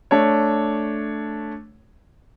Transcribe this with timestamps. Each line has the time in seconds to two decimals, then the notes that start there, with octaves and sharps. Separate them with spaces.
0.11 A3 D4 C#5